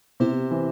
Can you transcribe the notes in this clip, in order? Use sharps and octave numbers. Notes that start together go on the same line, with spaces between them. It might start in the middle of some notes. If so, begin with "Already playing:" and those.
C3 B3 E4 G4 C5
E3